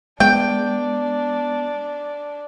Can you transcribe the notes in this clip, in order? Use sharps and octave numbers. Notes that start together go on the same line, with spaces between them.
G#3 B3 D4 G5